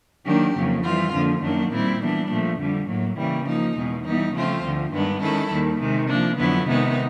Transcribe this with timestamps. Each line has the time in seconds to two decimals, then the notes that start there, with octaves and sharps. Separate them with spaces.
0.25 D#3 F#3 A#3 D4 G4
0.54 F2 C#3 F#3 A#3
0.83 E3 G3 C4 F4
1.12 F2 D3 F3 A#3
1.42 F#2 D#3 F#3 A#3 D4
1.72 A#2 G3 C4 E4
2.00 E3 G3 B3 D4
2.29 A#2 F3 A3
2.58 F2 D3 G3
2.87 A2 F#3 A#3
3.17 C#3 E3 G3 A#3
3.46 F3 A#3 D#4
3.75 E2 B2 G#3
4.04 E3 G3 B3 D#4
4.33 C#3 F3 A3 C4 F4
4.62 D2 D3 F3
4.92 G2 D#3 G#3 B3 D4
5.21 D#3 G#3 C#4 E4 A4
5.49 D#2 D#3 G3
5.79 C3 D#3 G#3
6.09 F3 A#3 D4
6.38 F2 D3 F#3 B3 E4
6.66 C3 D#3 G#3 B3 D#4